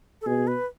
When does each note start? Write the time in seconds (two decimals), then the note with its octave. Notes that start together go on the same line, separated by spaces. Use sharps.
0.21 A4
0.26 B2 G#4
0.47 B4